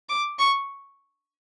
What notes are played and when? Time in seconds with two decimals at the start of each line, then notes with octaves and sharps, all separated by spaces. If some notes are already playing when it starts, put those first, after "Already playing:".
0.09 D6
0.39 C#6